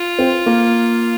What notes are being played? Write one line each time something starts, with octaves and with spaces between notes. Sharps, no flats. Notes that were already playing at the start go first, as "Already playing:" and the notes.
Already playing: F4
C4
A#3